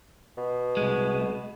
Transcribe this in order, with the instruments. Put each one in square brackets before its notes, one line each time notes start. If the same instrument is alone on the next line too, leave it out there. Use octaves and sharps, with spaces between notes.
[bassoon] B2
[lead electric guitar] C2 G#3